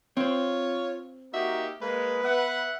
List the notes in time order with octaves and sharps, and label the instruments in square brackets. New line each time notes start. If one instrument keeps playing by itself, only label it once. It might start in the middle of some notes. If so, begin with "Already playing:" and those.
[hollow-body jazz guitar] C4 C5 [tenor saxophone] F4 [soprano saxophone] C#5
[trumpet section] A#3 D#4 G4 [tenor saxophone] F#4 [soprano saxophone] E5
[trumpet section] G#3 [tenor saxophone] A#3 [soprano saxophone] B4
[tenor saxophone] B3 [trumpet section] E5 F#5